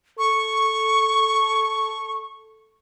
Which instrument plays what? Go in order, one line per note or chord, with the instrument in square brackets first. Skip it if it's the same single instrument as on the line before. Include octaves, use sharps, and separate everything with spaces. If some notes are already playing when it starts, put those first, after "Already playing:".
[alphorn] A4 [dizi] C#6